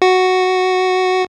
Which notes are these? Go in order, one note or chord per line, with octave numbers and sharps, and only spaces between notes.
F#4